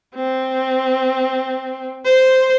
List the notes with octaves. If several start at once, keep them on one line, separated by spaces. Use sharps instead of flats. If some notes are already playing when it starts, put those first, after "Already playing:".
C4
C5